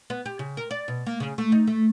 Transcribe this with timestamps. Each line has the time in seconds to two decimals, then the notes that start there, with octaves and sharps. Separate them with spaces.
0.10 B3
0.26 G4
0.39 C#3
0.57 A#4
0.71 D5
0.88 B2
1.06 A#3
1.20 C#3
1.38 A3
1.52 D#4
1.67 A3